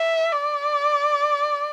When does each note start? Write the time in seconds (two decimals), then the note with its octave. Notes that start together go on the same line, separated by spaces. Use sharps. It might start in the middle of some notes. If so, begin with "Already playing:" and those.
Already playing: E5
0.32 D5